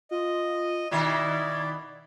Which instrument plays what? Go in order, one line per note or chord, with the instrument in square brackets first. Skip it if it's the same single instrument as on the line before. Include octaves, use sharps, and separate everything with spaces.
[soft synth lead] F4 [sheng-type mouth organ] D#5
[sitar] B2 D#3 E4 [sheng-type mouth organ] D5 [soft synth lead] G#6